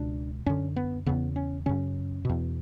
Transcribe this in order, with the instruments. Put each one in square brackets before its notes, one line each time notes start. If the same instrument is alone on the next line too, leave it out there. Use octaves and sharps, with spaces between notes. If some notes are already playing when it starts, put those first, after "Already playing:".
Already playing: [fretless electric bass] C#2 B2 D4
F#2 D3 C#4
B3
E2 C#3 B3
C#4
F#2 C#3 C#4
E2 B2